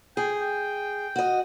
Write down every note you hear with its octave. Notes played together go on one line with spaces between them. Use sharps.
G#4 G5
G5
F#4 D#5